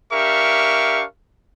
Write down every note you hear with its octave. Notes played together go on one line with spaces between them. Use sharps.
D4 G4 A#4 E5 F5 C#6